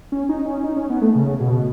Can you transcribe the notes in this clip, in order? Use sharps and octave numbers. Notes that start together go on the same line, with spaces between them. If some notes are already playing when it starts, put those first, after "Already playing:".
C#4
D#4
C#4
D#4
C#4
B3
A3
C#3
B2